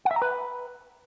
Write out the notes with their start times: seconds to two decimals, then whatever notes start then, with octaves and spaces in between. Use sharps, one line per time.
0.05 F#5
0.11 E5
0.16 A#5
0.22 B4